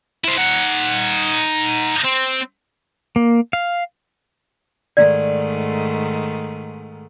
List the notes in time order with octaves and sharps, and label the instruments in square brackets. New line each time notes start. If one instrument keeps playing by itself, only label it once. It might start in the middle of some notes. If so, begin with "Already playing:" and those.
[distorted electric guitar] E4 C5
D#4 F#5
C4
[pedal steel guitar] A#3
F5
[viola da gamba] G#2 D#3 A3 [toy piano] D5